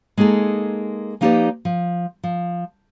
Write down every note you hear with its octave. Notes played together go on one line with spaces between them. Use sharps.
G#3 A#3 D#4 G#4 A4
F3 A#3 D#4 G4 B4 D5
F3
F3